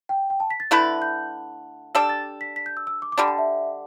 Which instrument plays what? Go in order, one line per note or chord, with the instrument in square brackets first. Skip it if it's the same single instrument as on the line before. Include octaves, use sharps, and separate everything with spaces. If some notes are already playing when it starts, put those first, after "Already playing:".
[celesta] G5
G5
A5
B6
A6
[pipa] D3 A3 E4 B4
[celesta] G6
[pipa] G3 D4 A4 [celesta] E6
[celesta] A6
B6
B6
G6
E6
E6
D6
D6
[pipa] D3 G3 D4 [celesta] B5
[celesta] A5
E5